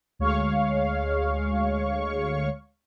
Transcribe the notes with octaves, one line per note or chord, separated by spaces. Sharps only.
D2 G#3 C#5 F5 C#6